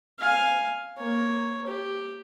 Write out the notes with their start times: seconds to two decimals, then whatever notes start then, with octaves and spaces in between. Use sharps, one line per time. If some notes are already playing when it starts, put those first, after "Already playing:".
0.19 F5 G#5
0.98 A#3 C#5
1.67 G4